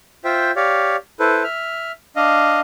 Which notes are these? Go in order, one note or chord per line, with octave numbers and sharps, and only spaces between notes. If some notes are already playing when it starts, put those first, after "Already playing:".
F4 C5 E5 G5
G4 C#5 D5 F5
E4 A4 B4 C5
E5 F6
D4 D#5 F5